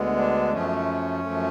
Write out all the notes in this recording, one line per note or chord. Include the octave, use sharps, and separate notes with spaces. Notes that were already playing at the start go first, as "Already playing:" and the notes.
Already playing: D2 D3 G#3 B3
D4
F#2 F3 A3 C#4
F#2 F3 A3